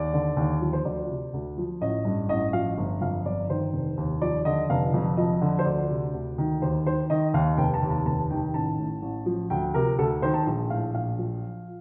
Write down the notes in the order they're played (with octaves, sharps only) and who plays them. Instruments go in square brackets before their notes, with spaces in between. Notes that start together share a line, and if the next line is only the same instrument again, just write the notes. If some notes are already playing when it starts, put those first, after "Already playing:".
Already playing: [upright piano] D#2 D5
D3
D#2
F3
C5
D2 D5
C3
D2
F3
A1 D#5
G2
A1 D#5
F3 F5
G1
F2 F5
G1 D5
D#3 C5
F1
D#2
F3 D5
D3 D#5
F1 F5
F2
F3 D#5
D3
C5
D2 D5
C3
D2
D#3
D#2 C5
D#3 C5
D#3 D#5
D#2 F5
F1 G5
A5
D#2
A5
F1 A5
D#3 G5
A1 A5
A2
A1
F3
D2 G5
C3 A#4
D2 A4
D#3 C5
A5
A#1
A2 F5
A#1 F5
F3